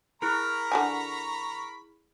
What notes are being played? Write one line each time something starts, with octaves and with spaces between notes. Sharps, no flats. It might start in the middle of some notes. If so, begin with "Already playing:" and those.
E4 G#4 A#4 A#5 B5 C#6 F6
D3 F#4 G#5